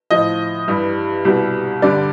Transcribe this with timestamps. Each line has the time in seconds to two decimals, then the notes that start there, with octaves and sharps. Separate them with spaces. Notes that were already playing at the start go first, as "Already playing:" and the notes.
0.10 A2 F3 D#5
0.68 G2 E3 G3
1.25 C2 B2 G3
1.82 G2 D3 G3 D5